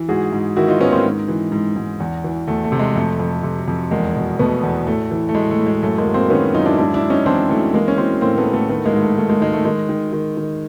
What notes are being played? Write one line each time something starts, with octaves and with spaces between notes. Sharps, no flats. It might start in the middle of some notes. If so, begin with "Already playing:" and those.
Already playing: E3
G#2 F#4 G#4
G#2
D#3 E4 F#4
D#4 F4
G#2 B3 C#4
A#3 C4
G#2
E3
G#2
G#2
E2
E3
E2 A3
A3
C3
G#3
F2 A3
F2
C3
F2
E2 G#3 A#3
B2
B2 A3 B3
E2
A2 A3
E3
A3
A2 G#3
A3
A2
G#3
F#2 A3
G#3 A#3
F#2
A#3 C4
D#3 B3 C#4
F#2 D#4 F4
D4 E4
G#2 D4 E4
D4 E4
G#2
C#4 D#4
E3 C4 D4
E3 A3
E3 G#3 A#3
C#4
E3 A#3 C4
A2 A#3 C4
A3 B3
A2
A3 B3
D#3 A3 B3
G#3 A#3
G#2
A3
D#3 A3
G#3 A#3
D#3 G#3
A3
D#3 G#3
D#3
D#3
D#3